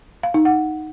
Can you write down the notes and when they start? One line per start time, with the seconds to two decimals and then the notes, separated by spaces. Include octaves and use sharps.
0.23 F5
0.34 D#4
0.45 F#5